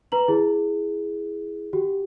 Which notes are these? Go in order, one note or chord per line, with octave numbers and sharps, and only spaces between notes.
B4 A#5 F#7
E4 G#4
F#4 G4